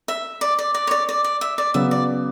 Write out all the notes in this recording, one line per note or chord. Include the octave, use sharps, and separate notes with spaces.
E5
D5
D5
D5
C#5
D5
D5
D5
E5
D5
C#3 F#3 B3 E5
D5